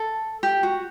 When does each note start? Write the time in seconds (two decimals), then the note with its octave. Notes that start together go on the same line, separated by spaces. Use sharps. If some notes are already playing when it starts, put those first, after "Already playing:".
Already playing: A4
0.43 G4
0.63 F#4